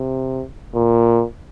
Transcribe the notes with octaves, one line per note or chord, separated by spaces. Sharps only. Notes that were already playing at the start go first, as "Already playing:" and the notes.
Already playing: C3
A#2